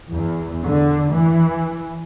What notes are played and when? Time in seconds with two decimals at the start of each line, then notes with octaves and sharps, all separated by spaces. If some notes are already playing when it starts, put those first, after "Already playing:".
0.12 E2
0.68 D3
1.15 E3